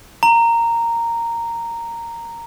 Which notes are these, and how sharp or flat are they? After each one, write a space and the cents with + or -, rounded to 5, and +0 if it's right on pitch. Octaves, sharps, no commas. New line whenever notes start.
A#5 -10